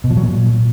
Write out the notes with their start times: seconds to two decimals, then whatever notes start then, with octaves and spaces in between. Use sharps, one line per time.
0.04 B2
0.10 F3
0.17 F#3
0.23 A#2